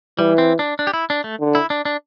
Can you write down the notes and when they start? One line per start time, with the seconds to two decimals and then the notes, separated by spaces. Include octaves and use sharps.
0.18 E3 G3
0.38 C4
0.59 D4
0.79 D4
0.87 G4
0.94 E4
1.10 D4
1.24 A3
1.40 D3
1.55 E4
1.70 D4
1.85 D4